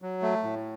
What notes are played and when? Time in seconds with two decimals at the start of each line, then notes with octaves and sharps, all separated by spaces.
0.02 F#3
0.22 A3
0.43 A2